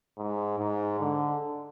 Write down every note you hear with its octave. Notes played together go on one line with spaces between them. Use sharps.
G#2
G#2
D3